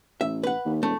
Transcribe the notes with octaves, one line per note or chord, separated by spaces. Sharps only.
A1 E5
B4 F#5
D#2
E1 A3